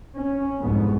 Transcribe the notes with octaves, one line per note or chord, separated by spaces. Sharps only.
C#4
C2 F2 G#2 B2 B3